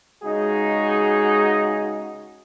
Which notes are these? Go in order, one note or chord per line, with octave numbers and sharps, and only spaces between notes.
C#3 G#3 D#4 F#4 G#4